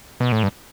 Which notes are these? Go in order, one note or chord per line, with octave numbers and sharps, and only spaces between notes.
B2
A2
G2